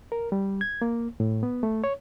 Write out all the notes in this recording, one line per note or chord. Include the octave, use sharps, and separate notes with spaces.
A#4
G3
G#6
A#3
A2
B3
A3
C#5